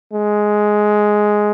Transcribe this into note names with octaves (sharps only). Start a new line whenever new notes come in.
G#3